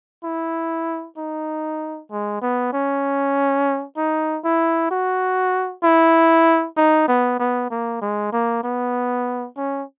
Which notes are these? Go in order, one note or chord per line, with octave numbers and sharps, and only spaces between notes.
E4
D#4
G#3
B3
C#4
D#4
E4
F#4
E4
D#4
B3
B3
A#3
G#3
A#3
B3
C#4